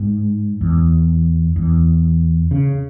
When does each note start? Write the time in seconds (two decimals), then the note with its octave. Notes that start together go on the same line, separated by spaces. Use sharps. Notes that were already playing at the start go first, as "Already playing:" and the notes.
Already playing: G#2
0.61 E2
1.56 E2
2.51 C#3